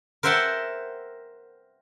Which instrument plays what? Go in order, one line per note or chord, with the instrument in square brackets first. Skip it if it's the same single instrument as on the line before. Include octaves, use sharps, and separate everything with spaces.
[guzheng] A#4 C5 E5 F#5 G5 A5